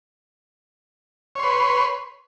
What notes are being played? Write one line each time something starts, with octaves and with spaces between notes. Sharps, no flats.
B4 C#5 C6